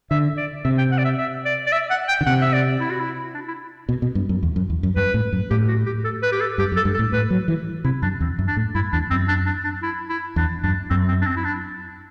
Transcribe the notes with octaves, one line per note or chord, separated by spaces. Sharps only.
D3 E5
D5
C3 E5
G5
F#5
D5
E5
E5
D5
D5
E5
F#5
G5
D3
C3 F#5
E5
D5
E4
F#4
E4
D4
E4
B2
B2
G2
F#2
E2
F#2
E2
F#2
G2 B4
A2
F#2
A2 G4
F#4
G4
A4
B4
G4
A4
G2 G4
F#2
A4
G2
A4
A2
A2 B4
F#3
E3
C3 E4
F#2 D4
E2 C4
F#2
D4
A2
G2 E4
E2 D4
F#2 C4
D4
D4
D4
E4
E4
E2 D4
F#2 D4
F#2 C4
C4
D4
C4
E4
D4